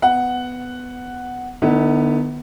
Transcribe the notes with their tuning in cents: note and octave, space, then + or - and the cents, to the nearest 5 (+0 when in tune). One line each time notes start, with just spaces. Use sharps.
B3 +15 F#5 +0
D3 +40 B3 -5 E4 -35